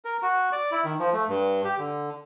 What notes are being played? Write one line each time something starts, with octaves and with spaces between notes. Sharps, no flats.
A#4
F#4
D5
E4
D#3
F3
A3
G2
G4
D3